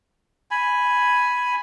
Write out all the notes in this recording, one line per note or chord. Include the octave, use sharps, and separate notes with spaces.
G#5 B5